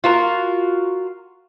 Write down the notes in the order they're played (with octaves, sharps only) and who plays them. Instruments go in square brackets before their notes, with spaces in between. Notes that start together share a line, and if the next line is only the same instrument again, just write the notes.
[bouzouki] F4 F#4 A#4